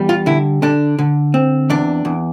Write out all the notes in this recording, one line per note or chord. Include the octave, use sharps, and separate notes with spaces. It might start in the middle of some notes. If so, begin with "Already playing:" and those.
Already playing: E2 G3
F4
D3 E4
D3 D4
D3
C4
E2 D4
E2